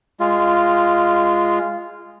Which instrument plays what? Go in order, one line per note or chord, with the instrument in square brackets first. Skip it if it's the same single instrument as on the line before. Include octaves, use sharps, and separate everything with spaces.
[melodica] G#3 F4